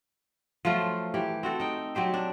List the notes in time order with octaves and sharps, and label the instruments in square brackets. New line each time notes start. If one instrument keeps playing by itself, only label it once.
[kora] F3 F#3 A3 F4
E3 G4
C4 F#4 A4
D#4 G5
F#3 C4 G4 C5
D4